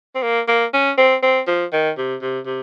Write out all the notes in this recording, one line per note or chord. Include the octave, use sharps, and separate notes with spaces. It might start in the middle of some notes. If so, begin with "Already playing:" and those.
C4
A#3
A#3
C#4
C4
C4
F3
D#3
C3
C3
C3